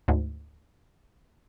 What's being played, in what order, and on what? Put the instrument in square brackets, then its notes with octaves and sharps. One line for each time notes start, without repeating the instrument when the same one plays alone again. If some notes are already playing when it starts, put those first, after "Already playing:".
[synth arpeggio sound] D2 G#2